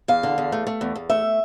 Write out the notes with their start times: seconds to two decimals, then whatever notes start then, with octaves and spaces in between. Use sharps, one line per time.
0.08 E2 F5
0.23 D3
0.38 E2
0.52 A3
0.67 A3
0.81 E2
0.96 E2
1.10 A3 E5